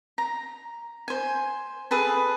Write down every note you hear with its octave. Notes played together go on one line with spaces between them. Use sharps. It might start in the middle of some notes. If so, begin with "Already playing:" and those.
A#5
C5 G#5
G#4 A4 B4 A5